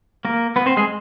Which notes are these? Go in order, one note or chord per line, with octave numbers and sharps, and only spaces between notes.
A#3 A#4
B3 B4
C4 C5
G#3 G#4